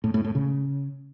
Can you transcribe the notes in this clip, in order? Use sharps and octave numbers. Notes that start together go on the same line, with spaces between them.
A2
A2
A2
C#3